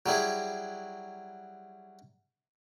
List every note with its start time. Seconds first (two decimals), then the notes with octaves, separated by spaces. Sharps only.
0.06 F#3 G3 E4 G#4